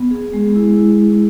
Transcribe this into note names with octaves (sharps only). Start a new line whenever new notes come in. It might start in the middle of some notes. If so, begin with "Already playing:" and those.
Already playing: B3
G#4
G#3
E4